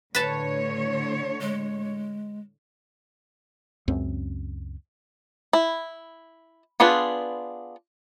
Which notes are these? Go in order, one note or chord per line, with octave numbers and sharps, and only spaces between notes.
A2 D3 B4 C#5 A5
G#3
C#2 F#2 C4
E4
B3 D4 F4 G#4 B4